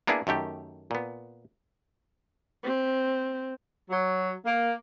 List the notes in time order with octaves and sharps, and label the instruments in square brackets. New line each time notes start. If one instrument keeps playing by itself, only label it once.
[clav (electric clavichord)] A#3 B3 D4 E4 G#4
F#2 D#3 A3 G4
A#2 B3
[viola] C4
[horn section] F#3
A#3